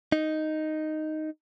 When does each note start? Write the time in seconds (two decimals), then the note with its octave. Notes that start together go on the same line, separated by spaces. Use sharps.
0.12 D#4